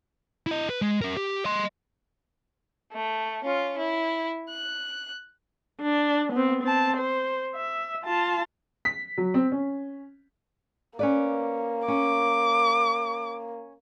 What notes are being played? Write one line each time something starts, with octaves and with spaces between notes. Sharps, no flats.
E4 D#5
B4
G#3
C#4 A#4
G4
D#5 C6
A3
C#4 F4
E4
F#6
D4
B3 C4
C4 A5
C5
E5
F4 A5
B6
F#3
C4
C#4
A#3 C#4 B4 D5
C#4 D6